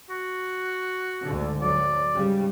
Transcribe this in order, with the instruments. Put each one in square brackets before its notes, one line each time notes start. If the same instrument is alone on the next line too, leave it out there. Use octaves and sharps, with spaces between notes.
[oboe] F#4
[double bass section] D2 G#2 D3
[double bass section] D2 F#3 [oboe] D5
[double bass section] G#2 C#3 G3